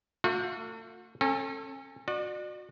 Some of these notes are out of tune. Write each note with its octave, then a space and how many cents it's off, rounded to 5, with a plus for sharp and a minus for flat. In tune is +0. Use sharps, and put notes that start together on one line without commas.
A3 +40 F#4 -40
C#4 -35 A4 +15
F#4 -25 D5 +40